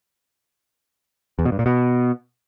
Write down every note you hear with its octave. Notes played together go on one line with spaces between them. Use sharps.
E2
B2
G2
A#2
B2